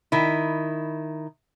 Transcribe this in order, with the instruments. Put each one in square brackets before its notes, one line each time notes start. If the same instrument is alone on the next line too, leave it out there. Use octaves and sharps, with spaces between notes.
[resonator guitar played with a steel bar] D#3 E4